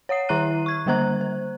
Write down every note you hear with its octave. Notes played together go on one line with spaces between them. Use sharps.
C#5 F#5 D#6 C7
D#3 E4 E5 A#5 F#6 D#7
C#6 G#6
D3 G3 A#3 C5 A#5 F#6
C5